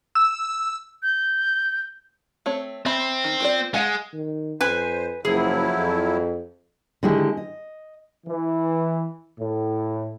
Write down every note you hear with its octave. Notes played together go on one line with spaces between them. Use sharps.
E6
G6
A3 C4 C#5
C4 E5 B5
D#3
F4 C5 D5
G#3 F5 F#5 G#5
D#3
F2 B4 C5 G#5
F#1 F3 F#3 E4 G#4
F2
D3 D#3 G#3 E4 G4
D#5
E3
A2